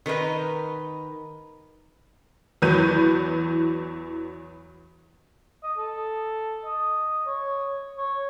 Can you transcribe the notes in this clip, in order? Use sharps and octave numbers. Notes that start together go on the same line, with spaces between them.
D#3 A#4 B4 D#5
E2 E3 F#3 B4 G6 D#7
D#5
A4
D#5
C#5
C#5